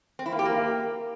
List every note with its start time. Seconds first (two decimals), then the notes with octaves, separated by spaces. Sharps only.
0.19 C4
0.26 E4
0.32 A#3
0.39 G4
0.45 A#3